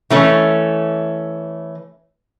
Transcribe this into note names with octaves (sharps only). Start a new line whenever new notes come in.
E3 A3 C#4